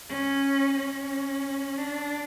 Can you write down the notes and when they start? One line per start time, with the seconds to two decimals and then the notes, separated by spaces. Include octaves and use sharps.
0.09 C#4
0.77 C#4
1.78 D4